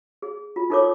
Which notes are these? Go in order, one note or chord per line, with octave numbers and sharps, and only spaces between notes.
G#4
F4
D#4 F4 A4 A#4 C#5 D6